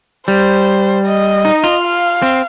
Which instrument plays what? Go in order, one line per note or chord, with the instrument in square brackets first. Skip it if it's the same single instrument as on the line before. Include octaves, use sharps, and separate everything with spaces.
[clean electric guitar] G3 [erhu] C5
[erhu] D#5
[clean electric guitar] D#4
F4
[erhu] F5
[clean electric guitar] C4